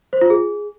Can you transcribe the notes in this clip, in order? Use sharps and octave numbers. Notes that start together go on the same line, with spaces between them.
C5
F4
G#4